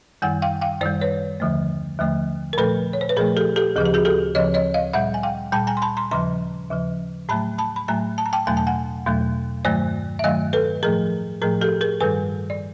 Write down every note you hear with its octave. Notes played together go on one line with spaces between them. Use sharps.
F#2 D#3 G3 F#5 G#5
F5 G5
F5 G5
F#2 D#3 G3 C5 D5
B4 C#5
D#2 D3 F3 A3
D#2 D3 F3 A3
A#4
A#2 F3 A3 A4 B4
C#5
C5
B4
A#2 F3 A3 G#4 A#4
G4 A4
G4 A4
D2 C#3 F3 G#4
G4
F#4 G#4
G4 A4
D2 C#3 F3 C#5 D#5
C#5 D#5
D#5 F5
A#2 G3 E5 F#5
G#5
F5 G5
A#2 G3 G5 A5
G#5 A#5
C6
A5 B5
A#5 C6
D#2 C#3 F3 A#5 C6
D#2 C#3 F3
A2 F#3 A3 A5 B5
A5 B5
B5
A2 F#3 A3 G#5 A#5
A5
A#5
G5 A5
E2 B2 F#3 A3 G#5
A5
F#5 G#5
E2 B2 F#3 A3
G2 D#3 F#3 A3 C5 D5
E5
G2 D#3 F#3 A3 D#5 F5
A4 B4
A2 F3 A3 G#4 A#4
A2 F3 A3 G#4 A#4
G4 A4
G#4 A#4
G2 D#3 G3 A4 B4
D5